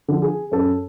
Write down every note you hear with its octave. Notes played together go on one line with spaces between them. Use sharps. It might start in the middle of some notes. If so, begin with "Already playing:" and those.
D3 F3
G#4
F#2 A4